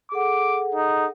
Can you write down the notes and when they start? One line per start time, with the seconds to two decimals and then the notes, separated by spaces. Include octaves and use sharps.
0.12 G#4 A4 F#5 D6
0.75 D#4